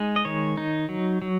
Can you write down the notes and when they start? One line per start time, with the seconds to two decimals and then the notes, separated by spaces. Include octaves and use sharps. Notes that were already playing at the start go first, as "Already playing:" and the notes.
Already playing: G#3 D#4
0.16 D#5
0.25 D#3 C#5
0.57 D#4
0.89 F#3
1.22 F#3